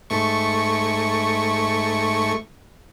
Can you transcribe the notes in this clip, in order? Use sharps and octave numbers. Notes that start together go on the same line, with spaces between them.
G#2 A3 C#6